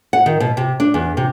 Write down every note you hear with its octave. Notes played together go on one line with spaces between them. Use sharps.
F#5
D#3
B2
C3
D4
E2
C3